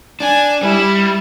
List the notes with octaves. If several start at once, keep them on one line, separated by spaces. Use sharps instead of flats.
D4 G#5
G3 E4